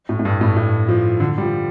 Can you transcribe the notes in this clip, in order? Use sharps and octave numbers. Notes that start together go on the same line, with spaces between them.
A2
A2
G2
A2
A2
F3
D3
G3
F3